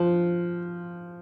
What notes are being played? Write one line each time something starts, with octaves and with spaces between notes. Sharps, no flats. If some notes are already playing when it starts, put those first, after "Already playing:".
Already playing: F3